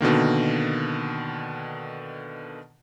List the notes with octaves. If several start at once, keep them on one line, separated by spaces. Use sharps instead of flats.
B2 D3 D#3 A#3